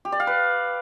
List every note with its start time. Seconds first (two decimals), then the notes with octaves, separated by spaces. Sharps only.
0.05 G4
0.12 D5
0.20 F5
0.27 B4